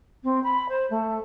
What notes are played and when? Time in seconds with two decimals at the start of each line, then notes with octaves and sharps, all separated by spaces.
0.24 C4
0.44 B5
0.69 C5
0.90 A3